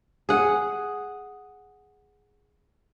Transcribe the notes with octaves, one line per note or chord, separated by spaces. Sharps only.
G#4 F#5